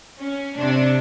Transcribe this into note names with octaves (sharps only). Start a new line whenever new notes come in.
C#4
C3 D4